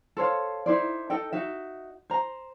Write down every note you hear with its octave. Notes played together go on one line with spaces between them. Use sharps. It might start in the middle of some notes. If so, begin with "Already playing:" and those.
A4 C5 C#5 F5
D#4 E4 C5 D5
D#4 A4 D#5 G5
D#4 F#4 E5
C5 A#5